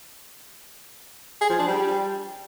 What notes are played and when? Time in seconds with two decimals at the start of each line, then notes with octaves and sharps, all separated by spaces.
1.41 G#4
1.50 F3
1.59 D4
1.67 G3